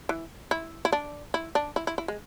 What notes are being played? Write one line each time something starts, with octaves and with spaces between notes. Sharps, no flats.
E3
E4
E4
D4
E4
D4
E4
E4
E4
G#3